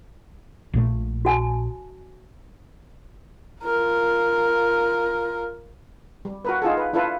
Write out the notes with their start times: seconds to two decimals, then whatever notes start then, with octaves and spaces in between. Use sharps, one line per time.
0.73 A#1 A#2 A3
1.25 F#4 G#5 A5
3.62 F4 A#4
6.25 G3
6.45 F#4 A#4 B4
6.62 D#4 F4 G#4 A4
6.77 B4
6.93 D4 E4 F4 A4 B4